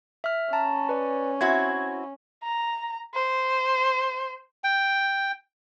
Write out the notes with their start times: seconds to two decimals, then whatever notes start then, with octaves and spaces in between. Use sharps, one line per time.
0.24 E5 F6
0.53 C#4 A5 A#5
0.89 B4 D5
1.41 C4 E4 F#4 G#6
2.44 A#5
3.15 C5
4.64 G5